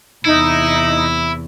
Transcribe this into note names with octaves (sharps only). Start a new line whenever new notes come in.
E2 C3 D#4 E4